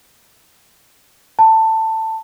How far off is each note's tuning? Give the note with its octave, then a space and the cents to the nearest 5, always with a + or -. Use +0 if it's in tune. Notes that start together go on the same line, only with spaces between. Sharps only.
A5 +15